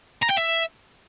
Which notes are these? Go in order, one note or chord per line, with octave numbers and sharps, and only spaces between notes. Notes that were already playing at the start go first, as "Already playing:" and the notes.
A#5
G5
E5